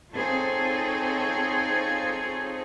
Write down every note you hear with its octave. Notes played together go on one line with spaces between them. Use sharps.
C4 D#4 F4 G#4 A4 C#5